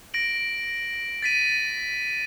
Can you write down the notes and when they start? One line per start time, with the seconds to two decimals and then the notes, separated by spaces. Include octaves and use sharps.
0.14 A#6 D7 F#7
1.22 A6 B6 D#7